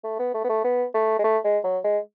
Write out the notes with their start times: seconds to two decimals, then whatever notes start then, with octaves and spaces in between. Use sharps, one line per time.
0.04 A3
0.19 B3
0.34 A3
0.44 B3
0.49 A3
0.64 B3
0.94 A3
1.19 G#3
1.24 A3
1.44 G#3
1.64 F#3
1.84 G#3